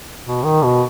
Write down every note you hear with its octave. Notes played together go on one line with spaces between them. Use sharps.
B2
D#3
B2